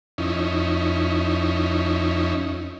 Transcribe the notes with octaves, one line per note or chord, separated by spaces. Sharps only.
F2 C#4 D#4 E4